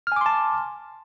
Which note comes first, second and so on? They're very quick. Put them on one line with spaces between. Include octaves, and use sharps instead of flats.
F6 G#5 D6 C6 A5